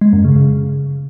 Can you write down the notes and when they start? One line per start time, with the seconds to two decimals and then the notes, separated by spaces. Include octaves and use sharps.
0.01 G#3
0.13 F#2
0.25 C#3
0.36 C#3